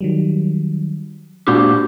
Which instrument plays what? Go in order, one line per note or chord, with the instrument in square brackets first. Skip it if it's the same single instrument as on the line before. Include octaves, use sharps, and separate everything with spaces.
[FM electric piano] D#3 F#3 G3
[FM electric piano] A#2 D4 G6 [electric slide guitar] A#3 F#4 G4